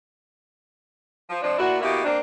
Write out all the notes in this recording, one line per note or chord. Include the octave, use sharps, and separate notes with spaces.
F3
F3 G#3 C4 D4
A#2 D4 E4 F#4
B2 A3 A#3 E4 G4
A#3 C4 D4